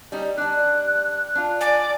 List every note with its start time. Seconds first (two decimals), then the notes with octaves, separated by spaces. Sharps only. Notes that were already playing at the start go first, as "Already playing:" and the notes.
0.12 G3 C#4 D#4
0.37 G3 D4 F#6
1.35 D4 F4
1.61 D5 G#5